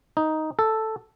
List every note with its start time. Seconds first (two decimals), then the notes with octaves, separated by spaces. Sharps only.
0.17 D#4
0.59 A4